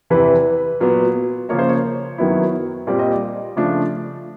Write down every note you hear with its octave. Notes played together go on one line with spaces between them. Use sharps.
E2 C3 E3 B4
A#2 F#3 B3
C#3 F3 A#3 C#5
C5
C#5
F#2 D#3 F#3 B3 E4
A#2 G3 C4 D5
D#5
D5
C#3 F3 A3 D4 F4